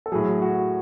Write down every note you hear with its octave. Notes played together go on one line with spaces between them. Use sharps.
A4
A2 F#3 G#4
F#4